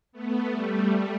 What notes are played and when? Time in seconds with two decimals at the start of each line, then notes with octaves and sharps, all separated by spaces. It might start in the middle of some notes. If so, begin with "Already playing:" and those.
0.12 A3 B3
0.48 G3 A3